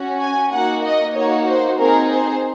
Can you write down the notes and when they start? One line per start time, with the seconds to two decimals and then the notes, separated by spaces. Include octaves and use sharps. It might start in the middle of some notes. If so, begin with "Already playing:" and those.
Already playing: C#4 F#4
0.21 G#5
0.52 A#3 D#4 F#4 F#5
0.84 D#5
1.15 A#3 D#4 F#4 C#5
1.47 C5
1.79 C4 D#4 G#4 A#4
2.11 C5